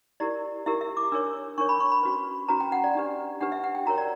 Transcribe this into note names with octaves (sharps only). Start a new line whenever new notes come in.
E4 G4 A#4 D5
E4 G4 A#4 E5
E5
D6
D4 A#4 C#5 E6
D4 A#4 C#5 C#6
B5
C#6
B5
C#4 F#4 B4
C#4 F#4 B4 A#5
G5
F#5
D5
D4 G4 B4
D4 G4 B4 F#5
E5
F#5
G5
F#4 A#4 C#5 A#5
D5